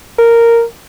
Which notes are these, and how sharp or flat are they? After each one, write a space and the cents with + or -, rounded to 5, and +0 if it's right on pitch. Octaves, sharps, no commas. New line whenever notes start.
A#4 -5